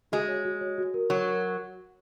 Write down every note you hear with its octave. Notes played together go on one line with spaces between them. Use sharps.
G#3 F#4
C#5
F#4
C#5
F#4
A#4
F#3 C#5
A#4